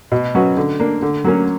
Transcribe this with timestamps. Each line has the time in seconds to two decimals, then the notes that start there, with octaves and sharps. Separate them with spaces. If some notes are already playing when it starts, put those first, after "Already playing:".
0.12 B2
0.35 F#3 C#4 F#4 B4
0.57 D3
0.80 A#3 D4
1.02 D3
1.24 F#3 A#3 C#4